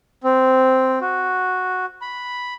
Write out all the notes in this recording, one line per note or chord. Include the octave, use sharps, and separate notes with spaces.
C4
F#4
B5